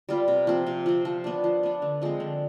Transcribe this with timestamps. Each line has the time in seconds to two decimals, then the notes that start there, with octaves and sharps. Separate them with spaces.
0.09 G3 B3 F4
0.28 C3
0.47 F3 C4
0.67 C3
0.86 F3 C4
1.05 F3
1.24 B3 D4
1.44 F3
1.63 B3 D4
1.82 D3
2.02 F3 G#3 C4
2.20 D3